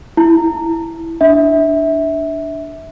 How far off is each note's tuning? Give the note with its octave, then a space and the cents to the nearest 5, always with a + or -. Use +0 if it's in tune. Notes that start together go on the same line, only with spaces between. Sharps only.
E4 +0 A5 +5
D4 +0 E5 -20